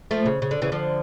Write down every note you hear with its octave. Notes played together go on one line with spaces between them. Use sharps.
F3 A3
C#3
C#3
D3
C#3 E3
D3 F3